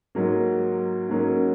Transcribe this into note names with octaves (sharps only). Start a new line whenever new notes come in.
G#2 F#3 A#3
G#2 F#3 A#3 C#4